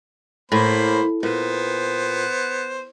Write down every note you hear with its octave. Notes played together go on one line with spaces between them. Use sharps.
A2 A#3 C5 B5
A#2 B3 C5